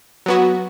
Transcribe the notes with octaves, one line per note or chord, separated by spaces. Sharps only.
F#3 B3 F#4